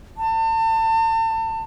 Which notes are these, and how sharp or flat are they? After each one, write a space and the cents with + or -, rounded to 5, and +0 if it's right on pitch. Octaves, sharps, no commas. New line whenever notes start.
A5 +35